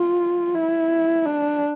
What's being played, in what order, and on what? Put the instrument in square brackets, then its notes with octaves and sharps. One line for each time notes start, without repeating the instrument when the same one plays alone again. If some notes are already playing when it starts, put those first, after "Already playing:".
Already playing: [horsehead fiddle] F4
E4
D4